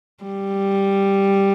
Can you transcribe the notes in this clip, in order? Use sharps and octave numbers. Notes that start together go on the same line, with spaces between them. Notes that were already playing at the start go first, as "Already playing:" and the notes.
G3